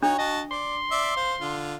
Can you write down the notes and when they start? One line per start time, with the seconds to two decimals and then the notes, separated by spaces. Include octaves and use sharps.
0.02 D4 D#4 F#4 C#5
0.18 F#4 D#5 A5
0.51 D5 C6
0.91 D5 E5
1.16 C5 F5
1.41 D3 F4